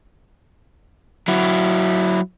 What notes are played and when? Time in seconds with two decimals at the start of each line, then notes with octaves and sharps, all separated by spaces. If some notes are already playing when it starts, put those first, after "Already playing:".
1.28 F#3 E4